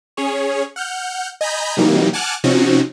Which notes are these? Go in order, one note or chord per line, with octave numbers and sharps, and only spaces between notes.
C#4 G#4 C#5
F#5 F6 G6
D#5 G#5 A#5 B5 G6
C3 E3 F#3 G3 A#3 D#4
F#5 G#5 A5 D6 F6 F#6
C3 F3 C4 C#4 D#4 F#4